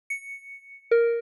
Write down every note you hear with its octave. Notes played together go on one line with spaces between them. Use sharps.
C#7
A#4